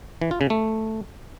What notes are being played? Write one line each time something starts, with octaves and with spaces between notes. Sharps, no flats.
E3
F4
C#3
A3